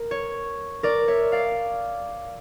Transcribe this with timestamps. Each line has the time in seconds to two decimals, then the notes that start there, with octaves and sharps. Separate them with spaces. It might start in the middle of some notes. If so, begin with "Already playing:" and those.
Already playing: A#4
0.11 C#5
0.83 A#4 D5
1.08 C#5 E5
1.32 D5 F5